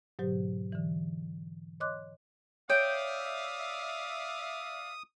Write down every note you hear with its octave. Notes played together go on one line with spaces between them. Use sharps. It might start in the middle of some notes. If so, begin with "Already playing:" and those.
G#2 B2 D3 F#3 G4 C5
D3 E3
C#5 D#5 C6 D6 F#6
C#5 D5 E5 F5 G5 D#6